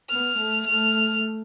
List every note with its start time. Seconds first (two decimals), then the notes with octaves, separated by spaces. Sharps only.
0.10 B3 F6
0.38 A3
0.66 A3 F6